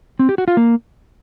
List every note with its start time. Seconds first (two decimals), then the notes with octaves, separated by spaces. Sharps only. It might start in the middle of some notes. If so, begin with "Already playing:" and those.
0.19 C4
0.29 G4
0.38 F#4
0.48 F4
0.57 A#3